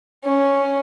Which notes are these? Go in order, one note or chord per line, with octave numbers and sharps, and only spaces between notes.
C#4